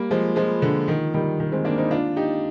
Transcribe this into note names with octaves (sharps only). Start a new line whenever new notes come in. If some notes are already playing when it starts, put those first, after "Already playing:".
Already playing: G3 A#3
F3 G#3
F3 G#3
D3
D#3
D#3 G3
D#3
G#3 C4
A#3 D4
C4 D#4
D4 F4
D#4 G4